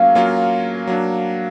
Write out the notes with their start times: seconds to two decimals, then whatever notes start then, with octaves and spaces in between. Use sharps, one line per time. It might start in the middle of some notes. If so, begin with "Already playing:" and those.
Already playing: F#3 A#3 C#4 F4 F5
0.15 F#3 A#3 C#4 F4
0.87 F#3 A#3 D4